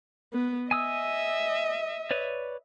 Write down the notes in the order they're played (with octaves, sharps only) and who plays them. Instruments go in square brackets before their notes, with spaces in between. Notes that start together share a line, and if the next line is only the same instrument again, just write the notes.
[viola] B3
[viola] D#5 E5 [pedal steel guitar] G#5 D#6 E6
[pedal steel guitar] B4 C#5 D5